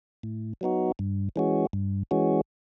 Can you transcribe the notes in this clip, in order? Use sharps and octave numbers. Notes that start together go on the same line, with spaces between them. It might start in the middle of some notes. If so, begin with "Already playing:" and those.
A2
F#3 B3 D#4 F#4
G2
E3 G#3 C#4 F#4
G2
E3 G#3 C#4 F#4